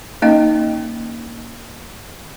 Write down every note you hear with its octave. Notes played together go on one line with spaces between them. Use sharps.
A#3 C#4 D#4 D#5 G5